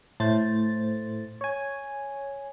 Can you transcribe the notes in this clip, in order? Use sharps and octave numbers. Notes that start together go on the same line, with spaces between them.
A2 A3 C5 A6
C#5 G#5